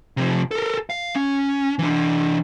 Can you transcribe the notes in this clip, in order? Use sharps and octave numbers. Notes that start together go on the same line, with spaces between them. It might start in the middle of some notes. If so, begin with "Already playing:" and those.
C3 F3
A4 A#4
F5
C#4
E3 D4